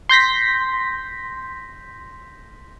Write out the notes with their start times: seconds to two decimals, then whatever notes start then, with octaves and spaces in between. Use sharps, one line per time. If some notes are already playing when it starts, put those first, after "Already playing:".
0.09 C6 G6 A#6 B6